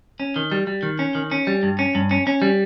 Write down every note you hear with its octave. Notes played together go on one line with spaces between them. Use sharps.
C#4
D#3
G3
G3
D#3
C#4
D#3
C#4
G3
G2
C#4
G2
C#4
C#4
G3